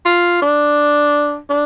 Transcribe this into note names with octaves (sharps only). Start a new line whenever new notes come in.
F4
D4
D4